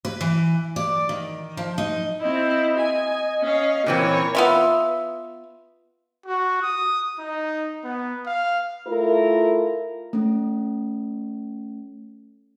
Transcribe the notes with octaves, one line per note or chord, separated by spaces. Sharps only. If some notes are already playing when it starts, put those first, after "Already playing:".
B4
E3
D5
D#3
F3
D#4
C4 E4 D#5
G#5
C#4 F5
A#2 E3 C4 A#4 C#5
B3 F4 E5
F#4
D#6
D#4
B3
F5
A3 E4 F4 A#4
A3 C#4